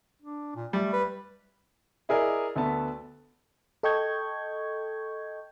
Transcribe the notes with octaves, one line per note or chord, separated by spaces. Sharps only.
D4
A#2
G3 A3
B4
E4 G#4 A#4 D5 D#5
D2 A3 B3 A5
A4 D#5 G5 C#6 G6 G#6